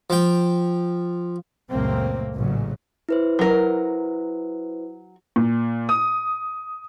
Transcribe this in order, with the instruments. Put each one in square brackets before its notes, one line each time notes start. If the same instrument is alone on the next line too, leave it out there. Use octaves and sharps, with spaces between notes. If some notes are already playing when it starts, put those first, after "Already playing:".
[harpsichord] F3 G5
[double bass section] C#2 F#2 A#2 A3 A#3 C4
A1 A#2 C#3 F#3
[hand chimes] E4 B4 C5
[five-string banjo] F#3 A#4
[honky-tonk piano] A#2
D#6